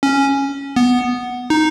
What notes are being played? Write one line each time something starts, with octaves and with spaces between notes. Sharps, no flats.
C#4
B3
D#4